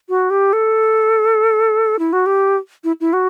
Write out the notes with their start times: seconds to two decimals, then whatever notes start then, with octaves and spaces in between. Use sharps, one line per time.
0.09 F#4
0.30 G4
0.53 A4
1.99 E4
2.13 F#4
2.26 G4
2.84 E4
3.01 E4
3.13 F#4